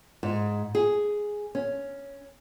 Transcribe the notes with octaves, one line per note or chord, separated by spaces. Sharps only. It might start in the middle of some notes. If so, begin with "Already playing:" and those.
G#2
G#4
C#4